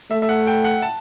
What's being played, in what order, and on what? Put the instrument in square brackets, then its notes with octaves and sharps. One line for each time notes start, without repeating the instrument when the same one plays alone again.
[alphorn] A3 [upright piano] E5
[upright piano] E5
F#5
G5
F#5
A5